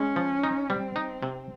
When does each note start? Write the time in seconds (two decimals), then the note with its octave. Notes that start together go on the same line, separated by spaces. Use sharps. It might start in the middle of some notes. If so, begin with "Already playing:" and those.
Already playing: G#3 C#4
0.16 F3
0.44 D#4
0.70 G3 C4
0.96 D#4
1.23 C3